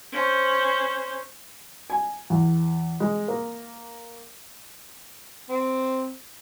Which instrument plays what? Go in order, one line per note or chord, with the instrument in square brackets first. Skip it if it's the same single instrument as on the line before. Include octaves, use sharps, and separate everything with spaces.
[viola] C#4 C5
[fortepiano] G#5
E2
G#3
A#3
[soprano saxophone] C4